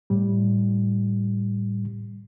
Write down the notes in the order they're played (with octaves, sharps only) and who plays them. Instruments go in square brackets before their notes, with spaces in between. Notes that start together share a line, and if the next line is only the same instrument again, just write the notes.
[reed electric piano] A2 G3